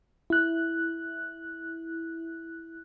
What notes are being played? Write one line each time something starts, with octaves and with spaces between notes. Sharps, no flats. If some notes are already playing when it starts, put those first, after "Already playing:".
E4 F#6